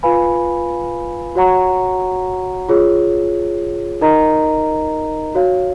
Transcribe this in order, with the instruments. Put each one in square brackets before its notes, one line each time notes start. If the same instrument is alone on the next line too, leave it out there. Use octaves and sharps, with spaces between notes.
[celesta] F4 B4 F5 G#5 B5
F#4 C#5 F#5 A#5 C#6
F4 G#4 C#5
D#4 A#4 D#5 A#5
F#4 C#5 F5